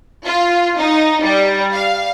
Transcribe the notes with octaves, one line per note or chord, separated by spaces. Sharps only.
F4
D#4
G3
F5